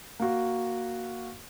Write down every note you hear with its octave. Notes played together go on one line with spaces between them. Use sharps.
A#3 F#4